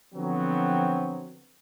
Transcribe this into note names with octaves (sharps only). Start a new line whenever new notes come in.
D3 F3 F#3 B3 C4